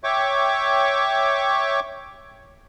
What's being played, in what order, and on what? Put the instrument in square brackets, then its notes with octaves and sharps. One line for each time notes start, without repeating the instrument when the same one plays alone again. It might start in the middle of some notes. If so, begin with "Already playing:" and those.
[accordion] C#5 E5 G5 C#6 D6